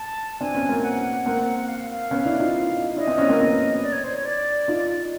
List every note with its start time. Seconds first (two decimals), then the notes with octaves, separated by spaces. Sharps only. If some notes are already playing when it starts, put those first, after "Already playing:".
Already playing: A5
0.41 C4 D4 G#5
0.55 B3 C#4
0.69 A#3 C4
0.83 F#5
1.26 A#3 C4
1.59 F#5
1.69 F5
1.91 F5
2.11 B3 C#4
2.26 D4 E4
2.40 D#4 F4
2.96 D4 E4 D#5
3.07 C4 D4
3.18 B3 C#4
3.29 A#3 C4
3.40 B3 C#4
3.82 D5
3.93 C#5
4.04 C5
4.15 C#5
4.25 D5
4.68 D#4 F4